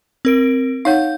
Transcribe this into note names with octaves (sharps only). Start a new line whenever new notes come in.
C4 A#4 D7
D#4 C#5 F5 F#5 G6